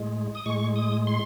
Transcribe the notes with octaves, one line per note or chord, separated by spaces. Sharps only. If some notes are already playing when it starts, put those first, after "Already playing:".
Already playing: A2 G#3
D#6
A2 G#3 C#6
D#6
C6